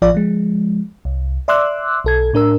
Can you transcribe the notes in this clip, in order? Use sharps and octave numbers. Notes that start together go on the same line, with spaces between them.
A1 F3 F4 D5
F3 G#3
C2
D5 E5 C6 D6 E6 F#6
B1 A4 G#6
A2 D4 A#4 E6